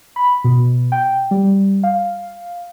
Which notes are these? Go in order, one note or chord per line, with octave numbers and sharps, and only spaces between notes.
B5
B2
G5
G3
F5